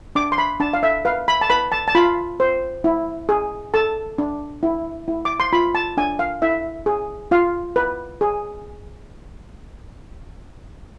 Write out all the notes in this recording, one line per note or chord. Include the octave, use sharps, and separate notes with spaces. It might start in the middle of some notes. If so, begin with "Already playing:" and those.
D4 D6
C6
B5
D4 A5
F5
E5
B4 F5
B5
A5
B4 B5
A5
A5
F4 B5
C5
E4
G#4
A4 A5
D4
E4
E4
D6
C6
F4 B5
A5
D4 G#5
F5
E4 E5
G#4
F4 F5
B4
G#4